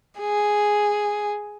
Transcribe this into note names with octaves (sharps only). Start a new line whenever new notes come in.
G#4